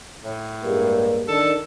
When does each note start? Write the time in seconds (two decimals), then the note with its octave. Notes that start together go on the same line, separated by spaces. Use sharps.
0.23 A2
0.62 G2 G#3 A#3
1.28 D#3 D4 A4